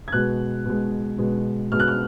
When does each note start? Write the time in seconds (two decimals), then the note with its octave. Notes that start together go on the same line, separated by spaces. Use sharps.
0.08 G#6
0.12 B2 G#3 F#6
0.65 B2 G#3
1.18 B2 G#3
1.72 B2 G#3 F6
1.80 F#6
1.88 F6